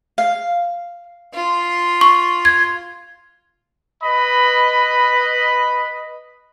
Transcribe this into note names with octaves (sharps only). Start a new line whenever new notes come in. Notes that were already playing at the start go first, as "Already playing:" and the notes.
F5
F4
C#6
G#6
B4 D#5 B5